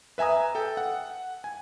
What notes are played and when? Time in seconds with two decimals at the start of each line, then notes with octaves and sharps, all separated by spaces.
0.18 B4 E5 G#5 A#5 D#6
0.55 A4 G5
0.77 F#5
1.44 G#5